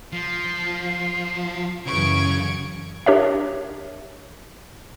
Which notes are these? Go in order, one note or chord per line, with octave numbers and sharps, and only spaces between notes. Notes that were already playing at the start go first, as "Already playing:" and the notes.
F3 C7
F#2 C#3 E3 F#3 C#6 G#6 D7
D4 G4 A#4 C#5 D#5 E5